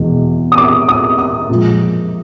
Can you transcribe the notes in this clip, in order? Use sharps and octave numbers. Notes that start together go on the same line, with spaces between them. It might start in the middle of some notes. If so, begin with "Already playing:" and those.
Already playing: E2 B2 G#3
D#6
D6
D#6
D#6
A#2 F3 G#3